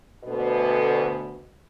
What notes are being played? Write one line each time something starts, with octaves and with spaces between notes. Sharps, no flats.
D2 B2